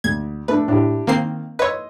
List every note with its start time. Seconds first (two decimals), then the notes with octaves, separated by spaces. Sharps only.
0.04 D2 G#6
0.48 A3 D4 B4
0.68 A2 D4 E4 G4
1.07 D#3 A#3 C4 F5 C7
1.59 B4 C#5 D#5 C6 E6